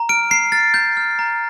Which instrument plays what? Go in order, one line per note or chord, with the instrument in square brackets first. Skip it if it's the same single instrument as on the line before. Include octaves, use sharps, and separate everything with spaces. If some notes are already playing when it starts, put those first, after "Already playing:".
Already playing: [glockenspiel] A#5
F6 D7
A#5 C7
F6 A6
A#5 G6
F6
A#5